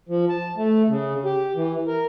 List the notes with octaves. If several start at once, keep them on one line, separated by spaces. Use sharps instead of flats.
F3
A5
A3
C#3
G4
E3
A#4